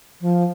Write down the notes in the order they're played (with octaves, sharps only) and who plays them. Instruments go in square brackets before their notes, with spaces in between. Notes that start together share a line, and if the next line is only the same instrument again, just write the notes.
[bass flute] F3